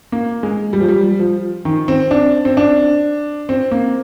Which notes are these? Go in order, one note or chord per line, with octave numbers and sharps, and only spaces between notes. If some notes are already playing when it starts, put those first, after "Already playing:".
A#3
G#3
G3
F3
G3
F3
D#3
C4
D4
C4
D4
C4
A#3